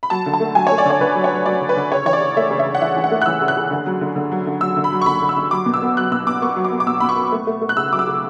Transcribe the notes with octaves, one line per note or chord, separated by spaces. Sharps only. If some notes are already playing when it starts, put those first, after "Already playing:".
B5
F#3 A5
D3
A5
A3
F#3 G#5
C#5
A3
D5
D3 C#5
D3 B4
F#3
C#5
F#3
F#3 D5
D3
B4
D3
C#3 C#5
E3 C#5
D5
C#3
A3 E5
C#3
E5
C#3
F#5
E3 E5
E3
F#5
A3
F#6
E3 E6
C#3
F#6
C#3
D3
F#3
D3
D3
F#3
D3
F#3 E6
D3
B5
F#3
C#6
D3 B5
D3
E6
D3
F#3 D6
B2
E6
B3
F#3 F#6
B2 E6
B2 D6
B3 C#6
F#3
D6
B3
D6
B2 E6
B2 B5
C#6
B3
A3
A3
A3
F#6
C#3 E6
F#3 D6
E6
C#3